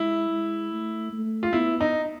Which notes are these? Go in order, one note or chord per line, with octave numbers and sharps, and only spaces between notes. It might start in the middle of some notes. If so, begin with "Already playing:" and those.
Already playing: G#3 E4
G#3
A3
A3
F4
B3 E4
D#4